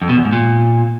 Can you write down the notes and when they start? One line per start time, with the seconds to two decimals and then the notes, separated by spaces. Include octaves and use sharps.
0.02 F2
0.09 B2
0.17 E2
0.25 G#2
0.33 A#2